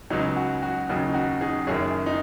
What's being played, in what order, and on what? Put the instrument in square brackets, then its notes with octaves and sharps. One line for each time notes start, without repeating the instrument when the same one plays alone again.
[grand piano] C#2 C#3 F#3 D#4
F#4
F#4
D#2 C#3 F#3 D#4
D#4
F#4
D#4 G#4
F#1 F#2 D#3 G#4 C#5
D#4